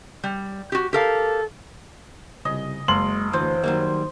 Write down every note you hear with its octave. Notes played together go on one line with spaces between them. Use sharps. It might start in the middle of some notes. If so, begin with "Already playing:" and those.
G3
F#4 G4
G4 A4 A#4 F5
C2 C#3 D#5
F#1 G#3 C6 F#7
D2 E3 C5
D#3 F#3 G3 A#3